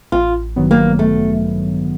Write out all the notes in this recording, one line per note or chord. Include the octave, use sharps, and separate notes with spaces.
A1 F4
G2 D#3 F#3 B3
A#3
A3